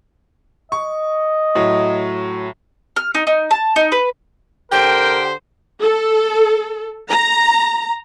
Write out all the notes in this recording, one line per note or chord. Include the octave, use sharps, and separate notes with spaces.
D#5 C#6
A2 F#3
F6
D#4
D#4
A5
D#4
B4
D3 G4 A#4 C5 G5
A4
A#5